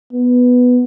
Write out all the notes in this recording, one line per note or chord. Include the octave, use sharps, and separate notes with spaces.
B3